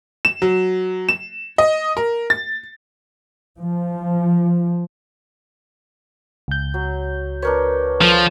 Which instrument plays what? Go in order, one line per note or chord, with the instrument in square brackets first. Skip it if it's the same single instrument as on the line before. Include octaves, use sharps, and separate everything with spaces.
[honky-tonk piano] E7
F#3
E7
D#5
A#4
A6
[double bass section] F3
[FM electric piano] C#2 G6
[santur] F#3
[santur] D4 A#4 C#5 [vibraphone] B4
[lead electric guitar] F3 [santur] A4